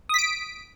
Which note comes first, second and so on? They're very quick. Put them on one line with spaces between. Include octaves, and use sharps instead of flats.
D#6 B6 D7